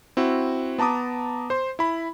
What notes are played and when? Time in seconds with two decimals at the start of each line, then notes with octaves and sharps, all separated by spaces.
0.17 C4 E4 F#4
0.78 B3 A5 A#5 D6 D#6
1.50 C5 C6
1.79 E4 B5